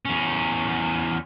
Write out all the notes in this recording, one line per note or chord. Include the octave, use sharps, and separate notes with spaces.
E2 C#4